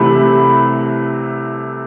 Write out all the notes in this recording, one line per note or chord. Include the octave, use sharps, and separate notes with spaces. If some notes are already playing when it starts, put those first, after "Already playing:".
Already playing: C2 C3 E3 A3 B5